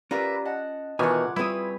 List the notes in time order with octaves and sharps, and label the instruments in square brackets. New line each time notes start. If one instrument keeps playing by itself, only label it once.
[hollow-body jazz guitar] C#4 F4 [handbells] G4 D5 F5 [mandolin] A#4 B4 E5
[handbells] D#5 A5 [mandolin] F#5
[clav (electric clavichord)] B2 D#3 E3 [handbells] F4 D6 [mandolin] C#5 F#5 [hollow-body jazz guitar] G#5
[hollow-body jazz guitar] G3 C4 [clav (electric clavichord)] E4 [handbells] F4 G#4 [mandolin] B4 C#5 D#6